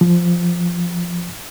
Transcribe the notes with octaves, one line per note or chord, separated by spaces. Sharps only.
F3